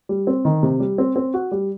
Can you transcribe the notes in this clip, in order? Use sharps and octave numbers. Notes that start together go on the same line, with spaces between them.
G3
C4
D#3
C3
G3
C4
C4
F#4
G3